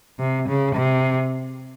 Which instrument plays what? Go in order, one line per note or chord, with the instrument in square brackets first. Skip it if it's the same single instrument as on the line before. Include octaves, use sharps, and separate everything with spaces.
[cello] C3
C#3
C3